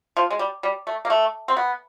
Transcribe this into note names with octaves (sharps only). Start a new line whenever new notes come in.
F3
G#3
G3
G3
A3
A#3
A3
C4
B3